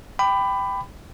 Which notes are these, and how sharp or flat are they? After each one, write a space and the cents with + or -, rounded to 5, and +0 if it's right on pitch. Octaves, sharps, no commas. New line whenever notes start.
G5 +0 B5 +20 D6 +20